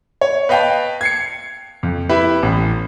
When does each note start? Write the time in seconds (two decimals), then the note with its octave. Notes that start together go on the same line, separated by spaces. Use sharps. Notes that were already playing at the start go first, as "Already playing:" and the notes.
0.21 C#5
0.49 B4 D#5 F5 G5 A5
1.01 G#6 C7 C#7
1.83 F2
2.09 E4 G4 B4 E5
2.43 A1